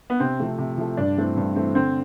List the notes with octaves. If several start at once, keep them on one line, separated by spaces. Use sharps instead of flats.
B3
C3 C4
F3 A3
C3
F3 A3
G2 D4
E3 A3 C4
G2
E3 A3 C4
D3 C4